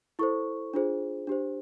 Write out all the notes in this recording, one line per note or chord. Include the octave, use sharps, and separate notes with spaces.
E4 A4 C5 C#6
D4 F4 G#4 C5
D4 G4 C5